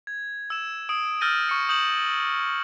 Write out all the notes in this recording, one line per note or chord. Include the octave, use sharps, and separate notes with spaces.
G#6
E6 E7
D#6 D7
E6 F6 G6 A6 A#6 D#7
C#6 C#7
D#6 G6 E7 F#7